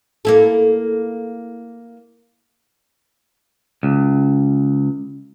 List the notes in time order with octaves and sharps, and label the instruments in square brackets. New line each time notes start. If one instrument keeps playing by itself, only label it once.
[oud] A#3 E4 A4
[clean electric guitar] C#2